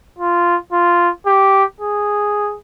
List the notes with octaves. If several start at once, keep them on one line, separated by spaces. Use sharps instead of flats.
F4
F4
G4
G#4